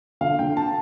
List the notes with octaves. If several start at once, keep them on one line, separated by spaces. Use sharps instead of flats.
D3 F5
D3 G5
A5